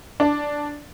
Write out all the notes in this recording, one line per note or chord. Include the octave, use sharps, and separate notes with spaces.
D4